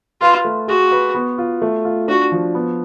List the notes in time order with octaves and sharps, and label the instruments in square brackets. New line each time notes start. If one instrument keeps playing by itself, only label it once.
[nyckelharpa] F4 [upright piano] B4
[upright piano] A3
[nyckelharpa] F#4 [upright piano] G#4
[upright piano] B4
B3
F4
A3
F4
[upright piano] D4 [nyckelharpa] F#4
[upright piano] F3
B3